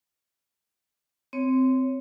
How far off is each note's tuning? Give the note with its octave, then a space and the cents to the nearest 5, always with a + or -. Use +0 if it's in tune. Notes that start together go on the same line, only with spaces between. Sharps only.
C4 -10 C#5 +0